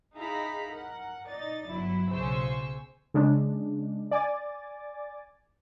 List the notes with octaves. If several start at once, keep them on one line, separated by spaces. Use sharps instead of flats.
D#4 E4 G#4 F5 A#5 B5
A#4 F#5
D#4 D5 A6
G1 F#3 E4
B1 C#3 C5 G#5 C#6 E6
C#3 G#3 D4
D5 G#5 D6 A6